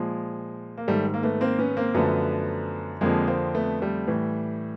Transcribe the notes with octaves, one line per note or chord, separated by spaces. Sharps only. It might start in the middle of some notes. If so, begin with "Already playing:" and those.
Already playing: A#2 F3 G#3
A#3
G#2 D#3 G3 A3
A#3
A3 B3
A#3 C4
B3 C#4
A#3 C4
F#2 D3 F3 A3 B3
F2 D3 F3 G#3 A#3
A#3 C4
A3 B3
G3 A3
A2 E3